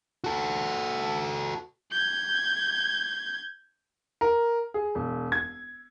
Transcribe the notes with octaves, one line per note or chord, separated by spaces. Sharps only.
F#4 A4
G6 G#6
A#4
G#4
E1
G#6